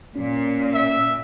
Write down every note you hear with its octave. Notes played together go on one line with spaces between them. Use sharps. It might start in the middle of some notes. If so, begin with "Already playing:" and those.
A#2 C#4
E5